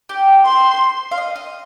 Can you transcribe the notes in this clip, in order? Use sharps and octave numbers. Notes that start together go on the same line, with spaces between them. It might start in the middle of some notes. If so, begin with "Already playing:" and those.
G4
C5 C6
F5
D#5
D#5